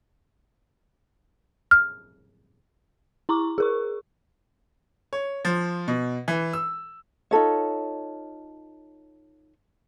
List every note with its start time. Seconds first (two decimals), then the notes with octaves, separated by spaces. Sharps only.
1.71 F6
3.29 E4 A#5 C#6 D6
3.58 G#4 A#4 C#6
5.13 C#5
5.45 F3
5.88 B2
6.28 E3
6.53 E6
7.31 D#4 F4 A4 C#5